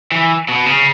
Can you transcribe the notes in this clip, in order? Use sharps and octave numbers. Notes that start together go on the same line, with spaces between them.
E3
B2
C#3